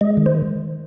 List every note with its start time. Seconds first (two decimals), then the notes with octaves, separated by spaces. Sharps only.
0.01 G#3 D#5
0.17 D#3
0.26 C5